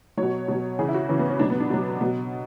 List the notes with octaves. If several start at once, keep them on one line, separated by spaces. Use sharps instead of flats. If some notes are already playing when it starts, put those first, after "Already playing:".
B2 F#3 C#5
B2 F#3
C#3 E3 G#4
E4
F#4
C#3 E3 C#4
B3
C#4
B2 F#3 D4
B3
D4
B2 F#3
B2 F#3